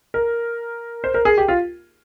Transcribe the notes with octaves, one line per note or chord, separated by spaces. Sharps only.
A#4
C5
A#4
G#4
G4
F4